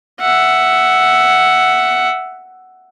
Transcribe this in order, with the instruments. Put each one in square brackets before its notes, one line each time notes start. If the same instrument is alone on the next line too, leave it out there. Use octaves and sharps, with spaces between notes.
[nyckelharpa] E5 F#5